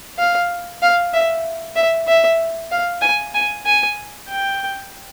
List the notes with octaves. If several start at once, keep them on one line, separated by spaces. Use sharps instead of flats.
F5
F5
E5
E5
E5
F5
G#5
G#5
G#5
G5